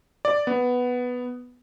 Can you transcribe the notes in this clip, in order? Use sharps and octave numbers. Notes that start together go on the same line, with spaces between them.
D5
B3